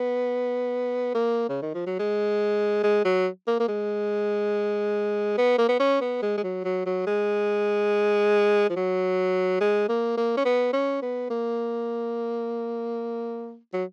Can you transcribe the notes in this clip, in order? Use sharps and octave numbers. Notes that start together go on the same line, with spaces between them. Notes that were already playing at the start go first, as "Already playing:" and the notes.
Already playing: B3
A#3
C#3
D#3
F3
F#3
G#3
G#3
F#3
A#3
A#3
G#3
B3
A#3
B3
C#4
B3
G#3
G#3
F#3
F#3
F#3
G#3
F3
F#3
G#3
A#3
A#3
C#4
B3
C#4
B3
A#3
F#3